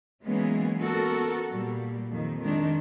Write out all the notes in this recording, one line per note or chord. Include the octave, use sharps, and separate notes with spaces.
E3 F#3 G#3 A#3 B3 C#4
B3 F#4 A4 A#4
A#2 G3
F2 D#3
D#3 G#3 D4